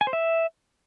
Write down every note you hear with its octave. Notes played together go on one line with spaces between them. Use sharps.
G#5
C5
E5